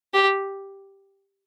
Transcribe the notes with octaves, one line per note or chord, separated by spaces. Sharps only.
G4